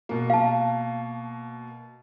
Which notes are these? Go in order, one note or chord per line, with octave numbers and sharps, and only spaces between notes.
B2 A#3
F5 A5